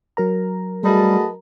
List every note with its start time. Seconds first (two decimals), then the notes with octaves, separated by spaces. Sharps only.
0.17 F#3 A#4 A#5
0.84 G3 A3 F#4 G#4 B4 D#5 A5